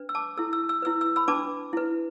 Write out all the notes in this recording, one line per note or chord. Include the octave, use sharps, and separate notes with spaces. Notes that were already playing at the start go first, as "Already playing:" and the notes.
Already playing: D4 B4
E6
A5 D6
E4 A4 E6
E6
E6
E4 B4 E6
E6
B5 E6
D4 B4 A5 D6
E4 B4